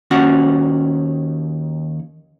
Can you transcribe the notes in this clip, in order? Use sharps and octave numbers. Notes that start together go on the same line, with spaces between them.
D#2 C#4 F#4 F#5